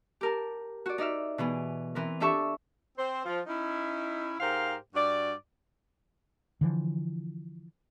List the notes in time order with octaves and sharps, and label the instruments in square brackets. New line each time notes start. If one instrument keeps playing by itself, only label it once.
[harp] G4 A#4 A5
F#4 D5
D#4 D5 E5 F6
B2 E3 B3 G#4
E3 C4 A#4
D4 G4 A4 E5 A5 C#6
[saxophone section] C4 C5
F3
C#4 D#4 E4
G#2 G4 A#4 C5 F5
G2 F#4 D5
[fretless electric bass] D3 E3 F3